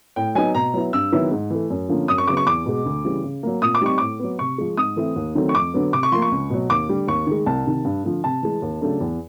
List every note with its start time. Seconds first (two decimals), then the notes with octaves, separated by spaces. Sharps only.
0.16 A2 G5
0.35 F#3 B3 D#4 G#5
0.55 B2 A#5
0.74 F#3 B3 E4
0.93 G2 E6
1.12 D#3 F#3 B3 E4
1.31 G#2
1.50 E3 A3
1.70 F#2
1.89 D3 F3 A#3 C#4
2.08 F#2 D#6
2.18 C#6
2.27 C#3 F#3 B3 D6
2.37 C#6
2.47 E2 D6
2.66 B2 G#3
2.85 D2
3.05 C#3 E3 G3
3.24 C#3
3.43 F#3 A#3
3.62 A#2 D#6
3.75 D6
3.81 G3 C4 D#4 C#6
3.98 A2 D6
4.19 F#3 B3
4.39 C3 C#6
4.58 F3 G#3
4.77 G#2 D#6
4.96 E3 A3 C4 E4
5.16 D#2
5.35 D#3 F#3 A3 C4
5.49 C#6
5.55 F2 D6
5.74 D3 F#3 B3
5.92 C3 D6
6.03 C#6
6.12 F3 A#3 C6
6.22 C#6
6.31 C#2
6.50 B2 F#3
6.70 D#2 D6
6.89 D3 G3
7.08 D#2 C#6
7.27 D#3 G#3
7.46 C2 A5
7.66 C3 D#3
7.85 G2
8.04 D3 F3
8.24 C3 A5
8.42 E3 G#3
8.62 D#2
8.81 C#3 F#3 A3 D4
9.01 E2